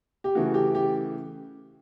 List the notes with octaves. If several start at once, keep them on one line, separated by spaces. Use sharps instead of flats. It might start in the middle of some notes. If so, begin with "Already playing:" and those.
G4
C#3 E3 A3 F#4
G4
G4